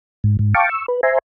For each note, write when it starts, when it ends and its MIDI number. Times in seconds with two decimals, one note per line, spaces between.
0.24 0.37 44
0.39 0.54 44
0.55 0.69 77
0.55 0.69 79
0.55 0.69 81
0.55 0.69 85
0.55 0.69 86
0.69 0.86 85
0.69 0.86 88
0.88 1.01 71
1.03 1.18 72
1.03 1.18 76
1.03 1.18 80
1.03 1.18 82
1.03 1.18 84